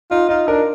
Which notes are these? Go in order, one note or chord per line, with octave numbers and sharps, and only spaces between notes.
D#4 F4
D#4 F4
D4 A#4